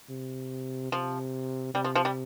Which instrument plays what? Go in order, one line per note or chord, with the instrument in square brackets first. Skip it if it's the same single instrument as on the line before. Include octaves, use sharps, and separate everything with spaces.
[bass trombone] C3
[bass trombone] C3 [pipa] F3
[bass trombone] C3 [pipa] G3
[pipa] F3
F3
G3